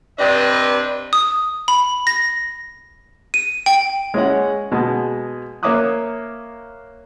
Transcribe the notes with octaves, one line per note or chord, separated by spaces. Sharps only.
G2 C3 C4 D4 B4 D#5
D#6
B5
A#6
D#7
G5
G#3 C#4 E4 C#5 F#5
B2 G#3 A5
A#3 C#5 E5 D6 D#6 F#6